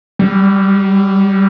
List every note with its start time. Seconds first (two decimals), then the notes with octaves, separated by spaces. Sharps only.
0.19 G3